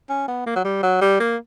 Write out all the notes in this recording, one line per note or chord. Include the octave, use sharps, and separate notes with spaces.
C#4
B3
A#3
F#3
G3
F#3
G3
A#3